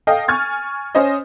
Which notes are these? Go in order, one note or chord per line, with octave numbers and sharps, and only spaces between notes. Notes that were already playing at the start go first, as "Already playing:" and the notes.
A4 D#5 F5 G5
G#5 C#6 F6 G#6 A6
C#4 C5 D#5